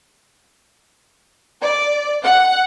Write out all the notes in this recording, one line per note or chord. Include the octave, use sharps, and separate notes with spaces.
D5
F#5